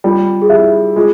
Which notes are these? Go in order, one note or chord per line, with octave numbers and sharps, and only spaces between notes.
G3 F4
G#4
E4 G4
G#3 F4